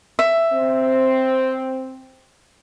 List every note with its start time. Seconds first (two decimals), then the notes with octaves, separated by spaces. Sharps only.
0.19 E5
0.53 C4